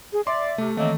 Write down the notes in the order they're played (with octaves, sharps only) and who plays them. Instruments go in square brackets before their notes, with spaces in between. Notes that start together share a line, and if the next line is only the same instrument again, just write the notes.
[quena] G#4
[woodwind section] D5 [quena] E5 [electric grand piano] C6 [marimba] D6
[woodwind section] C3 [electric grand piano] A3
[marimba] D#3 E3 [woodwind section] F#3 A#3 C4 [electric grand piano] A3 [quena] D#5